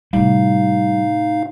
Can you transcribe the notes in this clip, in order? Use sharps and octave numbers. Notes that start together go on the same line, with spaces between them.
A2 C3 G3 D#4 F5